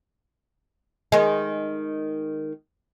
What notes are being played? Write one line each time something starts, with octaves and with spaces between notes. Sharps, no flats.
D#3 G#3